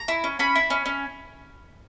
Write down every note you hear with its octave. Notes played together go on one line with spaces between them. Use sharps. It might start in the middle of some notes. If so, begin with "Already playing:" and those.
Already playing: A#5
E4
C#4
C#4 B5
E4
C#4
C#4